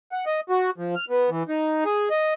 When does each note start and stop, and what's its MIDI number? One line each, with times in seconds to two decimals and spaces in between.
0.12 0.25 78
0.26 0.41 75
0.49 0.70 66
0.78 0.95 53
0.95 1.05 89
1.10 1.30 59
1.30 1.43 52
1.49 1.84 63
1.85 2.09 68
2.10 2.34 75